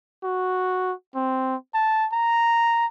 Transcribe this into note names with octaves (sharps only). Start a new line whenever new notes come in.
F#4
C4
A5
A#5